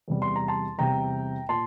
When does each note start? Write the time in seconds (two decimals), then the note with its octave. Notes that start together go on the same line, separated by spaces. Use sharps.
0.08 E2 C3 G3
0.22 C6
0.36 A#5
0.48 A5 C6
0.78 E2 C3 G3 G5 A#5
1.49 A#2 A5 C6